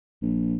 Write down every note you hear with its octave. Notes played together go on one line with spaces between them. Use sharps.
A#1